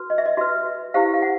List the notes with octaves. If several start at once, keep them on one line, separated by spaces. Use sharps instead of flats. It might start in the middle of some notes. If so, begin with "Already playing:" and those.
Already playing: F#4 B4
D#5
E5
D#5
F#4 B4 E5
E4 G4 C5 F5
F5
F#5